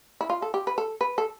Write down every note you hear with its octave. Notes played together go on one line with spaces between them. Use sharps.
E4
F4
A4
G4
B4
A4
B4
A4